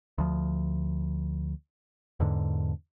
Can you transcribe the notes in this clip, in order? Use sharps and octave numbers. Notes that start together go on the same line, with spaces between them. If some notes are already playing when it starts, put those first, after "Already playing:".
D2 F3
E2 G#2 D3